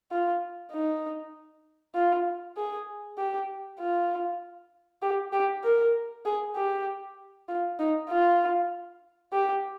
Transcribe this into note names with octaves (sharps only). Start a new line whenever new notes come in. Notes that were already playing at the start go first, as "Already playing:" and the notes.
F4
D#4
F4
G#4
G4
F4
G4
G4
A#4
G#4
G4
F4
D#4
F4
G4